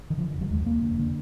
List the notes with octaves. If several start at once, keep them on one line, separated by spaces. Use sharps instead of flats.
D#3
D3 F3
F1
F#3
D#2 G#3
F1 A#3
D3
D3